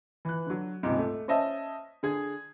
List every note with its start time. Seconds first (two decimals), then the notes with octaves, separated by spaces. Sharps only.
0.25 E3 F#6
0.47 D3 F#3
0.83 D#1 C#2 G#2 C3
0.99 A3
1.28 C#4 C5 D#5 E5 A5
2.03 D3 G#4 G#6